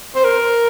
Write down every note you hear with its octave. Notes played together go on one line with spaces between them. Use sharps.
C5
A#4